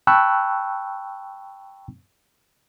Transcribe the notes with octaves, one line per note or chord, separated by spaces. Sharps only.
G5 A5 B5 C#6 E6 F#6